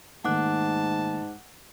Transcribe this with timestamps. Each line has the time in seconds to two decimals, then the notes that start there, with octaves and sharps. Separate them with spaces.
0.25 G#2 D#3 A3 A#3 F#5 A5 D6 F#6